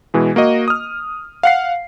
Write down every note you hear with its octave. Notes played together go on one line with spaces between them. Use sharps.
B2 E3 G#3
A#3 F#4 D#5
D#6 F6
F5 F#5 C7